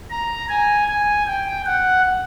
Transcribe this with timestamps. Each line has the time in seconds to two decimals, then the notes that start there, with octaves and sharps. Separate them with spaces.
0.10 A#5
0.49 G#5
0.88 G#5
1.27 G5
1.66 F#5